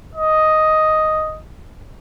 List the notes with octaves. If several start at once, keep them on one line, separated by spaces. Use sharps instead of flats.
D#5